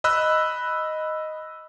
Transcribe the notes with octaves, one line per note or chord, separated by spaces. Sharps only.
D#5 B5 E6 F#6